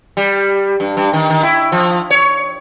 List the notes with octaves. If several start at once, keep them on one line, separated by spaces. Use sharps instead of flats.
G3
G2
G2
D#3
D#3
E4
F3
C#5